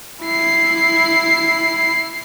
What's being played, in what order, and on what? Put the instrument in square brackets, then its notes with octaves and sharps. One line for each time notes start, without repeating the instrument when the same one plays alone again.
[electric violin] E4 C7